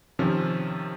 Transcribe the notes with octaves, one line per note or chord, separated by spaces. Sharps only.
C3 D#3 F3 C#4